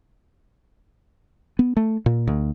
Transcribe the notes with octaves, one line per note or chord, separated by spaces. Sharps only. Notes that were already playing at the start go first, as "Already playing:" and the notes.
B3
A3
A#2
D2